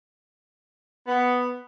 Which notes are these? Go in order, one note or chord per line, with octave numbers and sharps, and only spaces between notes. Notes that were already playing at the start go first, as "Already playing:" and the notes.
B3